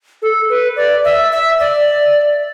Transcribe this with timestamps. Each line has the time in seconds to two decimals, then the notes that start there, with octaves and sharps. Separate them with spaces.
0.22 A4
0.49 B4
0.76 D5
1.04 E5
1.32 E5
1.60 D5